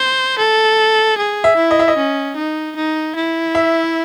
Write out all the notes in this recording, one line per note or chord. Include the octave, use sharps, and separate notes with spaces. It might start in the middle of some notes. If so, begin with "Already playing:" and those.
Already playing: C5
A4
G#4
E5
E4
D#5
E5
D#5
C#4
D#4
D#4
E4
E5